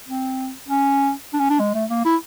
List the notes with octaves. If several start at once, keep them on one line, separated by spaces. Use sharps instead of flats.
C4
C#4
D4
C#4
D4
G#3
A3
A#3
E4